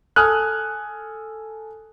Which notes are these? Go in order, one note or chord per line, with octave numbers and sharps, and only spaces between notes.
A4 G#5 D#6 F6 F#6